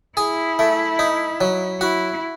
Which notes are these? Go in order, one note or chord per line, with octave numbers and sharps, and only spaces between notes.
E4 G#4
A3
D#4
F#3
E4 F#4